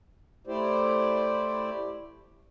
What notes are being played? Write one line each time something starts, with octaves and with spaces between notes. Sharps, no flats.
A3 E4 G4 C5 D5